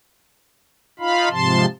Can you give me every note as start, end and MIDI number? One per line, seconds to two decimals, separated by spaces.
0.99 1.29 63
0.99 1.29 65
0.99 1.29 77
0.99 1.29 83
1.31 1.66 44
1.31 1.66 48
1.31 1.66 53
1.31 1.66 81
1.31 1.66 84